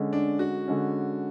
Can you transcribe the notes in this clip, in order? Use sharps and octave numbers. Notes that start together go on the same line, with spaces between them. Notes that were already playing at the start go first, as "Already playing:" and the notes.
Already playing: D3 G#3 C#4
D4
F#4
D3 G#3 C#4